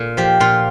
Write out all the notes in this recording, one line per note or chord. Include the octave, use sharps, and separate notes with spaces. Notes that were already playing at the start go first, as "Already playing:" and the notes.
Already playing: A#2
F3 G4
A#2 F4